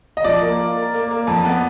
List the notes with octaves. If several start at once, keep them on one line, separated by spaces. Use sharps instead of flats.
D#5
F3 D5
A#3
F4
A#4
A#3
A#3
F2
B3